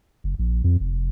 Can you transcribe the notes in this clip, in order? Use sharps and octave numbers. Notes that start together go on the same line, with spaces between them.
F#1
A#1
F2
F1